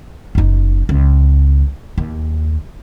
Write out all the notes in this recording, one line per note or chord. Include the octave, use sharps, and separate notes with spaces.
F#1 D#4
C#2
D#2